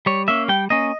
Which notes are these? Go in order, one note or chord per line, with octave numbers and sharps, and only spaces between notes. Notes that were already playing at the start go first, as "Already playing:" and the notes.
G3 C#5
A#3 C#4 E5
G3 G5
A#3 C#4 D#5